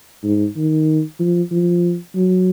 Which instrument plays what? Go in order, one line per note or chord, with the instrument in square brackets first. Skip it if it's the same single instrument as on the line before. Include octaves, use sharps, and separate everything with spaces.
[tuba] G#2
D#3
F3
F3
F#3